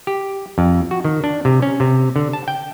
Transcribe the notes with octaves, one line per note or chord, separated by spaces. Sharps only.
G4
F2
F#4
D#3
D4
C3
C#4
C3
D3
A5
G5